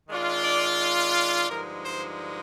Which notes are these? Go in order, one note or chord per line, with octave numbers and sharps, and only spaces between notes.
D#3 G#3 D4 F4
D5
D5
G2 D3 F3 G#3 D#4 A#4
C5